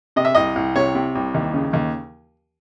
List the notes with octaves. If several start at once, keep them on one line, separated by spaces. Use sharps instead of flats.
C3 D#5
E5
C2 D#5
C2
C3 C#5
C3
C2
D#2
C#3
D#2